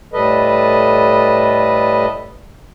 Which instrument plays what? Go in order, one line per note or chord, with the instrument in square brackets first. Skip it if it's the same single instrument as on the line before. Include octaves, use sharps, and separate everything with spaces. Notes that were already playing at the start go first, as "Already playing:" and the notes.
[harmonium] A2 G3 A4 B4 D#5